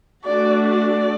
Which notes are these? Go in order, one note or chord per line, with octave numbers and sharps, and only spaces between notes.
A3 D4 F#4 D5
D5